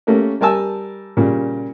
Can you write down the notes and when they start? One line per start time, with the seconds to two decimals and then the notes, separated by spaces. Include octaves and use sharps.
0.07 A3 A#3 C#4 G4 A#4
0.41 G3 A#4 G#5 A5 E6
1.17 A#2 C#3 G3